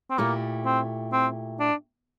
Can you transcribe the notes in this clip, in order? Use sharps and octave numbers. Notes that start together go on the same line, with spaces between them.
C4
A#2 A3 A#3 E4 G4
C4
C4
D4